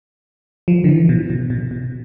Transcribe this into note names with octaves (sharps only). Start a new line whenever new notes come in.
F3
D3
E3
B2
B2
B2
B2